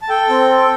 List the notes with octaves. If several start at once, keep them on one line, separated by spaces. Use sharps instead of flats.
A5
A4 G5
C4
A4